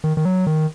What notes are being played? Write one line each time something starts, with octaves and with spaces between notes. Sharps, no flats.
D#3
D#3
F#3
D#3